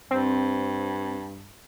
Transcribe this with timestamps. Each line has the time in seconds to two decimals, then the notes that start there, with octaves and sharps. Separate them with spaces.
0.11 G2 C4